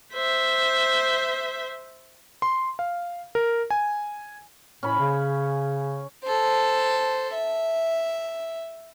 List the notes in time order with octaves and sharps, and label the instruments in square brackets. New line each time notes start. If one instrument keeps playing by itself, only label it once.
[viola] C5 E5
[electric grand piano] C6
F5
A#4
G#5
[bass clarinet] A2 [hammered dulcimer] C#4 B5
[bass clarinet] C#3
[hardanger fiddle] A4 C5
E5